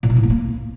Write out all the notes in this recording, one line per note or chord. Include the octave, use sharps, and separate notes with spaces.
A#2
D#4
A2
B3
A#3